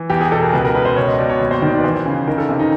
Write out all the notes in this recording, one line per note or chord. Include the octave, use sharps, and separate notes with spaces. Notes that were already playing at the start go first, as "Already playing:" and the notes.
Already playing: E3
E2 G4
G#4
B2 A4
A#4
C#2 B4
A#4
B2 B4
C5
C#2 C#5
D#5
B2 D5
C#5
D#2
C5
D#3 D5
D5
B4
E3 C5
C#3
D#3 A#4
A4
C3
D#4